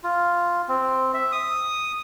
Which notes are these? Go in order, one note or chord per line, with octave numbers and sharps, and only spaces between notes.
F4
C4
E5
D#6